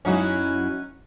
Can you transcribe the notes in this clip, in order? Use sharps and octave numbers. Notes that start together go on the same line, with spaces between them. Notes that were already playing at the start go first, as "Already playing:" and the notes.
F#2 F#3 C#4 D#4 E4 F#4